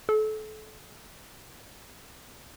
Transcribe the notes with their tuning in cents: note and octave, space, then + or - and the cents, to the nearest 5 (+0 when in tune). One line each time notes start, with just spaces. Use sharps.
A4 -30